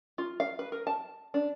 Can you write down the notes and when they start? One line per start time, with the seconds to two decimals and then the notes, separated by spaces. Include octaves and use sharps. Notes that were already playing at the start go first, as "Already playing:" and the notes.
0.18 F4
0.40 F5
0.59 B4
0.72 A#4
0.87 A5
1.34 D4